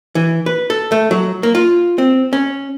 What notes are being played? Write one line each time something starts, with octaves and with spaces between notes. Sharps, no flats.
E3
B4
A4
A3
F#3
A#3
F4
C4
C#4